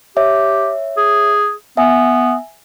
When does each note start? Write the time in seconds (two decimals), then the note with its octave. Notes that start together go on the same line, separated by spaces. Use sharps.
0.16 G4 C#5 E5
0.97 G#4
1.77 B3 E5 G#5